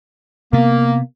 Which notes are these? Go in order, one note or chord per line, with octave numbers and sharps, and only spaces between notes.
C3 A#3 B3